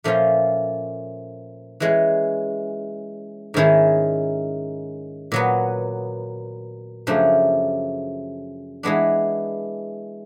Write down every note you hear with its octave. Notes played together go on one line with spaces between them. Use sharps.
A#2 F3 A3 C#4 F4
E3 G#3 C#4
G#2 D#3 G#3 C#4 E4
A#2 F#3 B3
F#2 C#3 F3 A3 D4
E3 G#3 B3 D4